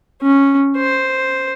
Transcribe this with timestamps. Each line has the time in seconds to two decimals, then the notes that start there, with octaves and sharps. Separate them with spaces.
0.21 C#4
0.76 C5